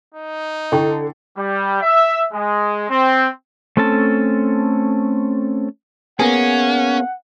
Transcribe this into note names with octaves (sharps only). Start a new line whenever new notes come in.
D#4
D3 E4 A4 G5 C#6
G3
E5
G#3
C4
A3 C4 C#4 A4 A5
A#3 B3 C#4 G#4 F#5